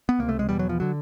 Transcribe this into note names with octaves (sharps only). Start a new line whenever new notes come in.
B3
C#2 C3 A#3
A3
G#3
E2 B2 G3
F#3
F3
D3 F#3